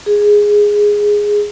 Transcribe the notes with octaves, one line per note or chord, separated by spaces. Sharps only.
G#4